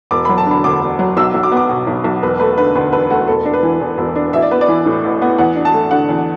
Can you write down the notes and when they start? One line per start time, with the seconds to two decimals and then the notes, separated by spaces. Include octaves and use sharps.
0.11 E1 D6
0.25 F#3 B5
0.38 A5
0.46 D3 B5
0.64 D2 D6
0.81 E1
0.99 F#3
1.17 B1 E6
1.34 B1
1.43 D6
1.52 B3
1.57 D6
1.69 B2
1.87 B1
2.04 B1
2.23 E1 B4
2.40 A3 B4
2.58 D3 B4
2.75 D2 B4
2.92 E1 B4
3.10 A3 F#4
3.27 E1 A4
3.45 D4
3.53 B4
3.63 E3
3.80 E2
3.98 E1
4.16 D4
4.33 A1 E5
4.42 D5
4.51 B3 B4
4.61 D5
4.68 E3
4.86 A2
5.04 A1
5.22 B3
5.38 E2 F#5
5.56 D4
5.65 A5
5.74 A3
5.91 D3 F#5
6.09 E2